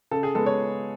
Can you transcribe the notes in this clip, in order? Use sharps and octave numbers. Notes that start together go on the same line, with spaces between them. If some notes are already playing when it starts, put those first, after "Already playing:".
C#3 A4
G#4
G#3 B3 A4
C#5